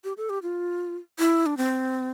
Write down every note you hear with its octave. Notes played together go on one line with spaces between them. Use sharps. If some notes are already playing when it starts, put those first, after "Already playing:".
G4
A4
G4
F4
E4
D4
C4